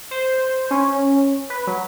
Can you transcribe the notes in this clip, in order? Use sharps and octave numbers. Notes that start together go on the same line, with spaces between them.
C5
C#4
B4
F#3